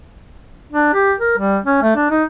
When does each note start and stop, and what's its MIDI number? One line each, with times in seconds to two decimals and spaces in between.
0.72 0.89 62
0.94 1.13 67
1.19 1.34 70
1.38 1.58 55
1.64 1.79 61
1.82 1.92 57
1.96 2.06 62
2.10 2.24 63